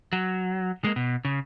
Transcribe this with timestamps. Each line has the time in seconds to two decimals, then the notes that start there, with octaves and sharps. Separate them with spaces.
0.13 F#3
0.84 G#3 A#3
0.96 B2
1.25 C#3